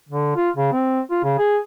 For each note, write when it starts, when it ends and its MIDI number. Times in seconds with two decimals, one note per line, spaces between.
0.09 0.34 50
0.36 0.50 65
0.56 0.70 49
0.73 1.01 60
1.10 1.22 65
1.23 1.34 49
1.38 1.58 68